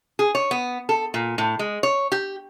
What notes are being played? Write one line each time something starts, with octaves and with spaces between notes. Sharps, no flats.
G#4
C#5
B3
A4
A#2
A2
G#3
C#5
G4